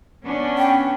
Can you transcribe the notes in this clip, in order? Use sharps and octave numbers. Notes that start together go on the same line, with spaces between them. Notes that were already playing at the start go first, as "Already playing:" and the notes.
B3 C#4 D4
G5